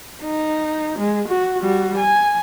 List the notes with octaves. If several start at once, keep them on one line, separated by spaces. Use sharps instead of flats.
D#4
G#3
F#4
G3 F#4
G#5